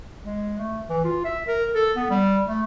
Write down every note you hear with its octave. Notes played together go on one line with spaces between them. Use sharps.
G#3
A3
E3
F4
E5
A#4
A4
B3
G3
A3